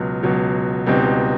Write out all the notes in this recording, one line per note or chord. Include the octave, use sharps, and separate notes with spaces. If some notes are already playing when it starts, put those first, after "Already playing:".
Already playing: C#2 B2 F#3 F6
C#2 B2 F#3
C#2 B2 G3 C4 D#4